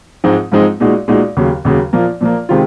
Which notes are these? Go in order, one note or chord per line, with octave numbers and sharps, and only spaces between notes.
G#2 F3 G#3 C4 D#4
G#2 F3 G#3 C4 D#4
A#2 G#3 D#4 F#4
A#2 G#3 D#4 F#4
D#2 C#3 F#3
D#2 C#3 F#3
A#2 F3 A#3
A#2 F3 A#3
C3 D#3 G#3 C4 F4